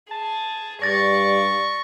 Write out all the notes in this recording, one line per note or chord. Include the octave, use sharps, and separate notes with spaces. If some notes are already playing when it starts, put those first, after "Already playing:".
G#4 A5
G2 D5 C#6 A6 A#6